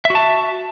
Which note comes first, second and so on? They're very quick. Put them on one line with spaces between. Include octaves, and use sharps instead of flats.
E5 F#4 A5